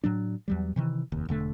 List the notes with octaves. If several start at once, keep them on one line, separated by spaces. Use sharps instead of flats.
A2 F#3 D4
E2 F#3 G3
C3 D#3 E3
F1 D#2
E1 D3 A3